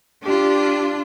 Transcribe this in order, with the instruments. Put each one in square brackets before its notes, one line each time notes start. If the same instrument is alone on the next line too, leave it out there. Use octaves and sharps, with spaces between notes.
[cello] D4 F4 [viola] G4